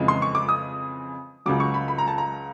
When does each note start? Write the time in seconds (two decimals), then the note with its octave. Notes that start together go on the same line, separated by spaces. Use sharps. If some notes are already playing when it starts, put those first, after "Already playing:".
Already playing: F2 C#3 E3 G#3
0.08 C6
0.22 C#6
0.35 D6
0.49 D#6
1.46 C#2 C#3 F#3 D6
1.60 C#6
1.74 B5
1.88 B5
1.98 A#5
2.08 A5
2.18 A#5